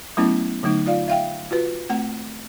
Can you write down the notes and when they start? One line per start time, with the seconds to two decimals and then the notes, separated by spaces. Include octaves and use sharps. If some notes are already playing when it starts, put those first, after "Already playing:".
0.17 F#3 A3 B3 C#4 E4
0.63 D3 F#3 A3 D#4
0.86 F4 D5 F5
1.08 E5 F5 G5
1.51 F4 F#4 B4
1.90 A3 C4 F#5